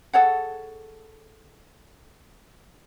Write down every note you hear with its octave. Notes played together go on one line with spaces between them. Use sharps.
G#4 A4 C#5 F#5